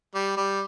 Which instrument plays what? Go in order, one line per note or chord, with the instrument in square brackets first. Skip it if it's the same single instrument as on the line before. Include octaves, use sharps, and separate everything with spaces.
[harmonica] G3
G3